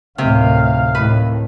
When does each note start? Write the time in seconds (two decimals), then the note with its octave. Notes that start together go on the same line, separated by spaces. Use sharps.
0.18 D2 A2 C3 D#3 F5
0.95 A2 D#3 B4